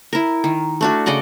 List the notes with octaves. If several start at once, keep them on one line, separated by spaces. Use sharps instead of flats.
E4 A#4
D#3
A3 D4 F#4
C#3 D5 D#5 F#5